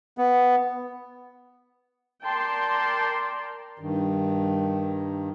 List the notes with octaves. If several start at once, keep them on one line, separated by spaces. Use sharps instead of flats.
B3
A#4 D5 G5 A5 A#5 C6
G2 D#3